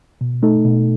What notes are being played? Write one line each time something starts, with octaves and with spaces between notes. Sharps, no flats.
B2
A3 D#4 A4
B2